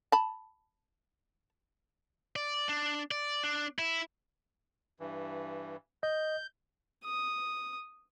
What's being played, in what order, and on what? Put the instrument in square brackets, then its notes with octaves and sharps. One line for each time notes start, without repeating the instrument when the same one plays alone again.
[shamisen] A5 B5
[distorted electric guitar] D5
D4
D5
D4
E4
[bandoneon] G2 E3
[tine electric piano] D#5 [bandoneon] G6
[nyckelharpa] D#6